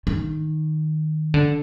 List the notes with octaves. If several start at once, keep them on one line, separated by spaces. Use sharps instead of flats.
D#3
D3